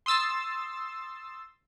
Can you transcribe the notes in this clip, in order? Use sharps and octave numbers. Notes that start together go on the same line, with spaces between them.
C6 D#6 E6 A6 C7